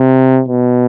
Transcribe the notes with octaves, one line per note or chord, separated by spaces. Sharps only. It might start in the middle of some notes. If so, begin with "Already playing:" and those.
Already playing: C3
B2